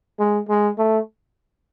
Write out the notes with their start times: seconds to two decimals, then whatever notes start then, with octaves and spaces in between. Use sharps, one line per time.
0.19 G#3
0.49 G#3
0.78 A3